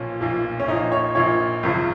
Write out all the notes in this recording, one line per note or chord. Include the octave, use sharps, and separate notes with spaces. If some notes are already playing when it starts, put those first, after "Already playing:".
Already playing: B1 A#2 F3 C#4
B1 A#2 F3
C#4
A#1 A#2 F3 D#4
C#5
A#1 A#2 F3 C#5
G#1 F#2 C#3 F3